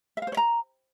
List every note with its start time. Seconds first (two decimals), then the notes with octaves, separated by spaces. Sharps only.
0.17 E5
0.22 F5
0.27 C5
0.32 C#5
0.37 A#5